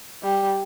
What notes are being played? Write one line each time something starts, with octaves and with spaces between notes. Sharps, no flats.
G3